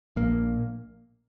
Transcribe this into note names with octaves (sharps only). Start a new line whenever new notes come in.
A#1 A#2 A#3